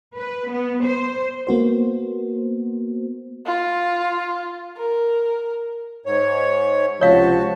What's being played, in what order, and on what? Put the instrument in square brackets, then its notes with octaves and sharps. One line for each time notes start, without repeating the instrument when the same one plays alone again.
[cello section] B4
B3
C5
[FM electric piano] A#3 B3 F#4 C5
[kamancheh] F4
A#4
[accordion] G#2 C#5
[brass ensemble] C#2 C3 F3 [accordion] F#4 A5 [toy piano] C#5 F5